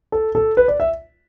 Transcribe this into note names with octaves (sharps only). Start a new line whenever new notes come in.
A4
A4
B4
D5
E5